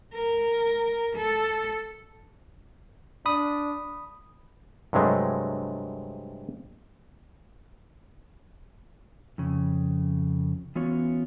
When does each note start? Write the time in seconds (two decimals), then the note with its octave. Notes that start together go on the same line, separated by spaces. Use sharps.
0.14 A#4
1.16 A4
3.26 D4 B5 D#6
4.93 G2 C3 F#3 G#3 A3
9.38 F2 C#3
10.75 E3 B3 C#4 F4 F#4 C#5